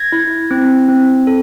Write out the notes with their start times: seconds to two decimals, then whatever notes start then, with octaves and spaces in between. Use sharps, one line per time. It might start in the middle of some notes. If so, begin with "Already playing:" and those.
Already playing: G#6 A#6
0.12 E4
0.51 C4
0.89 C4
1.27 A4